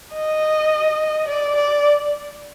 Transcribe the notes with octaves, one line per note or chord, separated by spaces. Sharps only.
D#5
D5
D5